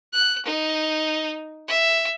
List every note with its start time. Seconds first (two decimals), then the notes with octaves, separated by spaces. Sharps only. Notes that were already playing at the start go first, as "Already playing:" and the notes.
0.12 F#6
0.45 D#4
1.68 E5